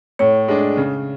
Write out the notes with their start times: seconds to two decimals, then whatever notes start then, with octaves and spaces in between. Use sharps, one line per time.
0.19 A2 C#5
0.48 G#3 D4
0.77 C#3